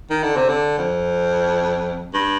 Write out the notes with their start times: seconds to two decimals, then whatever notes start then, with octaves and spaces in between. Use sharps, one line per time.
0.10 D#3
0.23 D3
0.36 C3
0.49 D3
0.78 F2
2.14 G2